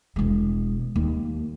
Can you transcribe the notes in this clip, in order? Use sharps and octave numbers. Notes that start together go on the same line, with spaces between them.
E1 G#3
D#2